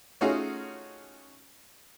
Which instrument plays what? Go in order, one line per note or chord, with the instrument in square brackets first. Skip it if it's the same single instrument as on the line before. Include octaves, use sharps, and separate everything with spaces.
[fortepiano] A3 C#4 D#4 F4 F#4 G#4